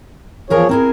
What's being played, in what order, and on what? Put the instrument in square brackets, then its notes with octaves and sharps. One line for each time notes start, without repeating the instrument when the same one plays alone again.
[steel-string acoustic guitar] E2 A#4 A#5 [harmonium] F3 G#4 C#5
[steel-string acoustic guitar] C4 E4 G#4 [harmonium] A#4